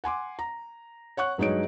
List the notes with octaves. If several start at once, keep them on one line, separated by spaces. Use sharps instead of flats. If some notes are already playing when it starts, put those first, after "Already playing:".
F#5 G#5 C6 D6
A#5
C#5 F#5 C#6 F#6
G2 F#3 G#3 D#4 C#5 D7